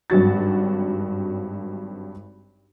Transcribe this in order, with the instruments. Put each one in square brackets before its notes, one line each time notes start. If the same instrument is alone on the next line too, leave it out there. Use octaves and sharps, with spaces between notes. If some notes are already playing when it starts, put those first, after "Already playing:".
[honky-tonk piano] G#1 G2 F#3 F#4 A6